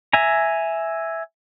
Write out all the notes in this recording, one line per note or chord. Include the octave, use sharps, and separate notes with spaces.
E5 G#5 A#5